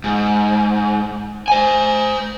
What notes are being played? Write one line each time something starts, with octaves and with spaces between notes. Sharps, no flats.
G#2
C5 G#5